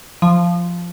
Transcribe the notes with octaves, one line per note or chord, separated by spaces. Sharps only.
F3